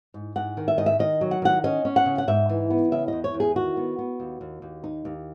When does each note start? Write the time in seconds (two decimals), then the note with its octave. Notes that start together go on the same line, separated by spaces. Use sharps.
0.14 G#2
0.36 G#2 F#5
0.57 D#3
0.68 E5
0.78 G#2 D#5
0.86 E5
0.99 D#3 D#5
1.21 F#3
1.31 F#5
1.42 D#3 F#5
1.64 C#4 D#5
1.85 C#4
1.96 F#5
2.06 C#3
2.18 F#5
2.28 G#2 E5
2.49 E3
2.70 B3
2.92 C#3 E5
3.08 E2 D#5
3.24 C#5
3.34 E2
3.40 G#4
3.56 D#3 F#4
3.77 B3
3.98 B3
4.20 D#2
4.41 D#2
4.62 D#2
4.84 D#4
5.05 D#2